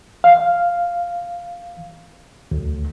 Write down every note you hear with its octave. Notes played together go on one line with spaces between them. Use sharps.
F5
D2